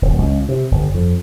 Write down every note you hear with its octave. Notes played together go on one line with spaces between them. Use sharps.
D1
C#2
C3
G1
F2